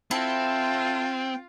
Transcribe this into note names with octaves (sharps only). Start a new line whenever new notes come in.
C4 E4 F4 A4 G5